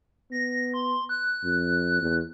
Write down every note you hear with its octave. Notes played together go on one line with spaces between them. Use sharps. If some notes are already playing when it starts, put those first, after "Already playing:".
B3 A#6
C6
F#6
F2
E2